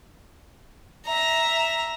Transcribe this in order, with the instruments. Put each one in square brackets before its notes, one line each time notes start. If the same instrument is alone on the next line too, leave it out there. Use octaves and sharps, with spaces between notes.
[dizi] E5 [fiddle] A#5